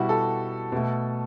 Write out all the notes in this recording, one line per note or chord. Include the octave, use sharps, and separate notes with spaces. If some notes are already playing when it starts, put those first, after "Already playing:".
Already playing: B2 G3 E4 F#4
A4
B2 A3